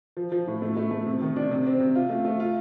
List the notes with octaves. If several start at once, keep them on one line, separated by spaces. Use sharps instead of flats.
F3
F3
A2
A3
A3
A3
C3
D#3
D4
C3
C4
C3
F4
A3
A3
F4